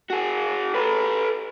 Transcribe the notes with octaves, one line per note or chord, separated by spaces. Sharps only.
F#4 G#4
A4 B4